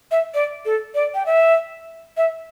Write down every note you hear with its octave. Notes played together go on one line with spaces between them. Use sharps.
E5
D5
A4
D5
G5
E5
E5